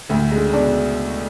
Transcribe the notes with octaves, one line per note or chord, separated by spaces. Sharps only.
D2 A2
G#3
D3
C#3
B2 D4